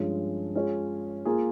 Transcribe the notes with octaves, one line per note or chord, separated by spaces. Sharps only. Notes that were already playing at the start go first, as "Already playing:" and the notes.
Already playing: G2 F3 G#3 C#4 F4
G#3 C#4 F4 G#4 C#5
A#3 F4 G#4